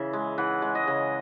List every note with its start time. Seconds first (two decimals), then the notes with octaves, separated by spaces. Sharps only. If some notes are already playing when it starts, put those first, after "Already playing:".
Already playing: C#3 E3 E5
0.13 G#3
0.38 E3 F#5
0.62 G#3
0.75 D#5
0.87 C#3